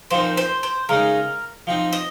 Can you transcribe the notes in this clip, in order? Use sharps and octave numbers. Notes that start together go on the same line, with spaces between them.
A#2 F3 C4 D#4 C5
C5
C5
C#3 G#3 D#4 A#4
F3 C4 D#4
D#5